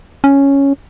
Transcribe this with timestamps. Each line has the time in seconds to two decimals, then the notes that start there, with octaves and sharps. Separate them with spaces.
0.24 C#4